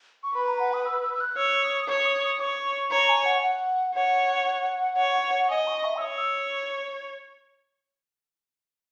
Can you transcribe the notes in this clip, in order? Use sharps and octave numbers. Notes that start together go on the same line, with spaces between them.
C#6
B4 B5
A#5
F#5
D#6
E6
E6
E6
F#6
C#5 E6
D#6
D#6
C#5 C#6
D#6
D#6
C#5 C#6
C#5 A#5
G#5
F#5
F#5
C#5 F#5
C#5
F#5
D#5 G#5
C#6
E5
E6
C#5 D#6
E6